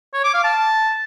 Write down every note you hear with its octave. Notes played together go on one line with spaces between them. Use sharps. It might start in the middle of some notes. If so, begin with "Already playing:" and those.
C#5
D6
F5
A5